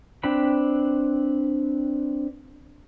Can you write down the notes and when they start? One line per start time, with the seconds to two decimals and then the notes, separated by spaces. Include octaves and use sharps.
0.23 C4 D4 B4 G5 B5